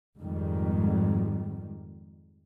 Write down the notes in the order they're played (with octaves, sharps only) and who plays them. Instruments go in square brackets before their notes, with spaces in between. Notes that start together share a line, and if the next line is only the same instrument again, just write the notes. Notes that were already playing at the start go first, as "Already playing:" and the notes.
[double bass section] F2 G#2 D#3 G3